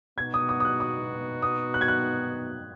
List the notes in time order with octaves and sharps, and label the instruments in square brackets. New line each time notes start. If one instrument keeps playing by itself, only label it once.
[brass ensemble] B2 B3 D#4 F#4 [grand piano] G#6
[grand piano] D#6
D#6
D#6
F#6
D#6
D#6
F#6
G#6
F#6